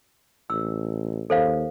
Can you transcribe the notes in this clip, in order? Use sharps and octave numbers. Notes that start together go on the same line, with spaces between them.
A1 E6
D#2 A4 C5 F5